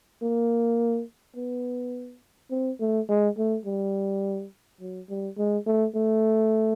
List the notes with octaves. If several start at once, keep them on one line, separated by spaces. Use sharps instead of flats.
A#3
B3
C4
A3
G#3
A3
G3
F#3
G3
G#3
A3
A3